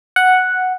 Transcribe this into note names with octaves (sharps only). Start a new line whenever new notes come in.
F#5